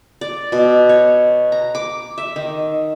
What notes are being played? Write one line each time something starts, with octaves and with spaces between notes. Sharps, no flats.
D5
B2
C#5
A#5
D6
E5
D#3